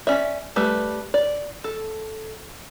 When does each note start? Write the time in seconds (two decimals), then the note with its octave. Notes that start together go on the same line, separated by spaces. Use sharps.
0.07 C#4 D5 E5
0.56 G3 A3 B4
1.14 D5
1.64 A4